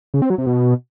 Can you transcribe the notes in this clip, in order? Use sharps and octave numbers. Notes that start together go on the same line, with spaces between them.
C#3
C4
F#3
C3
B2